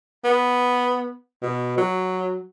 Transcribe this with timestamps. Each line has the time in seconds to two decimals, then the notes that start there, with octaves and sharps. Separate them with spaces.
0.25 B3
1.43 B2
1.78 F#3